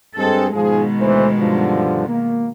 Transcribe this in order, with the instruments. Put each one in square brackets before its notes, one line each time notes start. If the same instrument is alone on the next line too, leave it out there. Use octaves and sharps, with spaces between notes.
[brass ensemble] G2 G#3 C4 [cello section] A4
[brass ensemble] G#2 F3 G#4 [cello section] B2 D#3 G#3
[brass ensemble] D2 E3 C5
G2 D3 F3
A#3